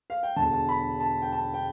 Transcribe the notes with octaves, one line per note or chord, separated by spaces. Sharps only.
F5
G5
E1 E2 D3 A5
A5
B5
A5
G5
A5
G5